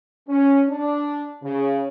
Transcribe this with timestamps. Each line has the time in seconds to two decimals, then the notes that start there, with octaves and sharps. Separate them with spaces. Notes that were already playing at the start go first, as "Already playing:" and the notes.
0.29 C#4
0.69 D4
1.43 C#3